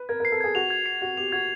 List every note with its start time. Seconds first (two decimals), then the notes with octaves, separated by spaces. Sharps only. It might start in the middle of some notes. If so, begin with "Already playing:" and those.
Already playing: B4
0.09 A#4 G#6
0.20 A#4
0.25 C7
0.32 A4
0.41 G#4 G#6
0.55 F#4 F7
0.70 G#6
0.86 C7
1.02 F#4 G#6
1.17 G4 F7
1.32 F#4 G#6